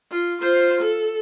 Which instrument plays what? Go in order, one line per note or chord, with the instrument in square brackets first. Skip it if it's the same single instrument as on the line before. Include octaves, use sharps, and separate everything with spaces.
[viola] F4
F4 C5
A4